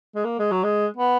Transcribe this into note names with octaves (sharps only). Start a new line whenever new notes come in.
G#3
A#3
G#3
F#3
G#3
B3